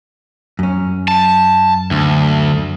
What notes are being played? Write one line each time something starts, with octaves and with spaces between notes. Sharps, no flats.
F#2 C#4
A5
D2